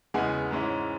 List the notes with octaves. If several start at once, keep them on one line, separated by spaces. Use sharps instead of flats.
E2 C#3 G#3 B3 E4 G#5
G#2 E3 G#3 C#4 E4